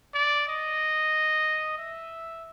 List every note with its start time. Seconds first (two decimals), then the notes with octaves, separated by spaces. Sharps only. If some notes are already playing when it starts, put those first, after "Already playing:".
0.14 D5
0.48 D#5
1.78 E5